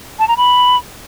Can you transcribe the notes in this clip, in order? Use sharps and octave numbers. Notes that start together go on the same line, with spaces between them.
A5
A#5
B5